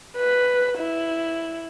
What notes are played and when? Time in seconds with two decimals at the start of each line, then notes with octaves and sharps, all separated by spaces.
0.17 B4
0.79 E4